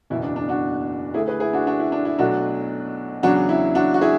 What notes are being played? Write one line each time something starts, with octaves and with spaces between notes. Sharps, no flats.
F#1 E2 B2 E4
D4
D4
D4 F#4
D2 D3 A3 E4 G#4
G#4 B4
E4 G#4
D4 F#4
D4 F#4
E4
D4
E4
B1 B2 F#3 A3 D4 F#4
E2 C#3 F#3 D4 F#4
E4
D4 F#4
F#4
E4 G#4